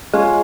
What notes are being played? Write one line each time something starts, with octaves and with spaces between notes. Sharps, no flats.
G#3 C#4 F4